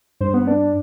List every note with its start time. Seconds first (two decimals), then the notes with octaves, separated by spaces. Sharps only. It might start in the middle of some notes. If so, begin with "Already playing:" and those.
0.21 G2 C5
0.34 B3
0.47 D4